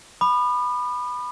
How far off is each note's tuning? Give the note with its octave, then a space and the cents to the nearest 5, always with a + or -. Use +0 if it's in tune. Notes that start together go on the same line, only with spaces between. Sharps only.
B5 +0 D#6 -45